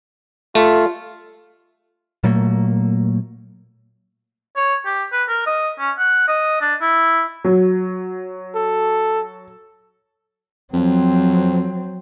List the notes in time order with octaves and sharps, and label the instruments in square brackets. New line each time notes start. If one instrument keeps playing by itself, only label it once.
[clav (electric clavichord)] A3 [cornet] F4
[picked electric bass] A#2 F#3 A3 A#3
[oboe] C#5
G4
B4
A#4
D#5
C#4
F#5
D#5
D4
E4
[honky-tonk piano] F#3
[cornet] A4
[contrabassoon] F2 [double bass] F#3 C4